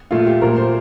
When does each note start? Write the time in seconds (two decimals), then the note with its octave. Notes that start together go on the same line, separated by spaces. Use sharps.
0.11 A#2 A3 F4
0.27 G4
0.41 A#2 A3 A#4
0.57 C5